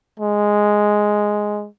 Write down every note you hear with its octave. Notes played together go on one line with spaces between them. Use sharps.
G#3